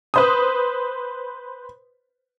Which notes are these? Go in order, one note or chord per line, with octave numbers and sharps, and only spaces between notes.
B4 C5 D#6